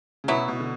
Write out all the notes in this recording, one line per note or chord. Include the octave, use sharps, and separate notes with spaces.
C#3
B2 F#3 B3 E4
B2
D3